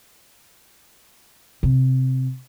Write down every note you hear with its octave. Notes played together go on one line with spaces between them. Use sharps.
C3